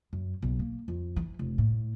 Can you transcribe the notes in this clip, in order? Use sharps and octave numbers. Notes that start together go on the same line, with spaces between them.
F#2
B1
A#3
F2
E3
F1
A2